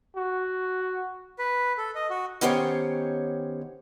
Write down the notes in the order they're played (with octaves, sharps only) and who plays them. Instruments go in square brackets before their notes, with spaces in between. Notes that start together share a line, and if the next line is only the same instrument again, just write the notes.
[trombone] F#4
[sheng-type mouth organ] B4
A4
D#5
F#4
[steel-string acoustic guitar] D#3 B3 C#4 G4 C5 C#5